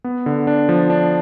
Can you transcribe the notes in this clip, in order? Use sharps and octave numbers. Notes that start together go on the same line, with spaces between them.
B3
D3
D4
F3
D4